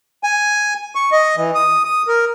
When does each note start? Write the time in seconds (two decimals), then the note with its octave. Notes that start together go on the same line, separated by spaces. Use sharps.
0.24 G#5
0.95 C#6
1.12 D#5
1.37 E3
1.55 D#6
1.85 D#6
2.08 A#4